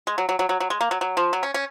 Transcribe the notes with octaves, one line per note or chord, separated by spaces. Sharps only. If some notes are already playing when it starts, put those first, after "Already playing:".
G#3
F#3
F#3
F#3
F#3
F#3
G#3
A#3
F#3
F#3
F3
F#3
C#4
C#4